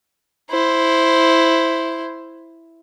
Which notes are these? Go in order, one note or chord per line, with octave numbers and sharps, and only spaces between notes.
E4 C5